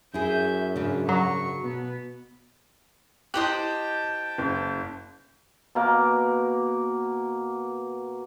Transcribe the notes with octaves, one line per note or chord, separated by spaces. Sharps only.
F#2 E4 G#4 E5 G6
G#2 C#3 D4
F#3 C#6
B2 B3
E4 G4 C5 D#5 G5 A5 F#6 F#7
F#1
B2 A#3 D6